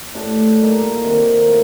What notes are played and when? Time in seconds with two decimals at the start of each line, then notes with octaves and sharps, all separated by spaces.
0.15 A2 A3 D4 G4
0.59 A#2 G3 A#3 D#4
1.03 C3 D#3 A#3 F4
1.47 A2